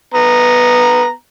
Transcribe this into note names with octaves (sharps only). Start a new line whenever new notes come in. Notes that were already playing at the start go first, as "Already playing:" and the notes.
B3 A#5